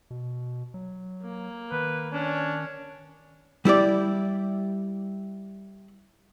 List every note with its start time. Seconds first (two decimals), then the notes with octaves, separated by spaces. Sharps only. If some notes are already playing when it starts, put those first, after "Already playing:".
0.11 B2
0.74 F#3
1.22 A#3
1.72 D#3 B4
2.12 C#4 D4
3.65 G3 E4 G4 D5